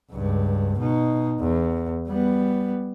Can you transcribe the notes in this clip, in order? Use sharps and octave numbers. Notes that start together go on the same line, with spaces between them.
C#2 G2
B2 D#4
E2
G3 B3